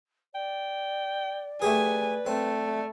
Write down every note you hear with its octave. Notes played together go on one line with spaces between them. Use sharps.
D5 G5
A3 G4 G#4 B4 G#5
A3 C4